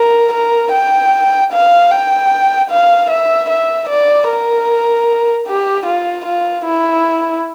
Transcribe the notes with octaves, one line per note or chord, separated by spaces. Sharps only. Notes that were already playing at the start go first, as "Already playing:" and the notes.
Already playing: A#4
A#4
G5
F5
G5
F5
E5
E5
D5
A#4
G4
F4
F4
E4